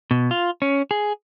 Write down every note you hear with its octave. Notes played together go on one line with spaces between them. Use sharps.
B2
F4
C#4
G#4